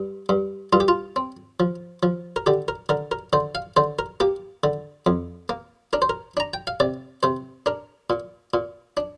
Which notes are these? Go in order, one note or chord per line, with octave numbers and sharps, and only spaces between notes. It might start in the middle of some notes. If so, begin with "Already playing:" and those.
Already playing: G2
G2
G2 F4
G4
F4
C4
F3
F3
A#4
D3 G4
A#4
D3 A#4
A#4
D3 C5
F5
D3 C5
A#4
A#3 G4
D3
F2
A#3
D4 A#4
C5
A#4
D4 A#5
G5
F5
C3 D5
C3 C5
D4 A#4
A#2
A#2
D4